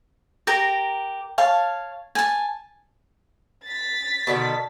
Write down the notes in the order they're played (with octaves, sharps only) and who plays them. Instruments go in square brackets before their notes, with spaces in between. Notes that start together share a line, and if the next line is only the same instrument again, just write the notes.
[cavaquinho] G4 A#4 A#5
C#5 F5 A5
G#5 A5
[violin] A6 B6
[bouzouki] B2 D3 D#3